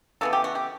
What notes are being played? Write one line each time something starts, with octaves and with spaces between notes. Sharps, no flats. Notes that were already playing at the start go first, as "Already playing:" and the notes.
C#3 E3 B3 A4
G4
F#4
G4